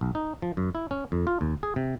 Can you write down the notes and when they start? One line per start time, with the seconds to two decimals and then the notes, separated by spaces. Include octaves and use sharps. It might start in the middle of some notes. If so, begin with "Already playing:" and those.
0.01 B1
0.15 D#4
0.42 F3
0.57 F#2
0.75 E4
0.91 C#4
1.12 F2
1.27 F4
1.41 D#2
1.63 G#4
1.76 C3